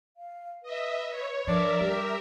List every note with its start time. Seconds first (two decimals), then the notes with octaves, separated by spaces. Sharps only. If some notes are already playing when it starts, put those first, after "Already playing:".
0.17 F5
0.63 B4 D#5 E5
1.11 C#5
1.47 F3 D4 A#4 D5 E5
1.80 G3 G4